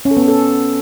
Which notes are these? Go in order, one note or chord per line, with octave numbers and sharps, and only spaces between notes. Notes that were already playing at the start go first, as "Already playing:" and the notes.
C#4
A4
B3
C#4
A4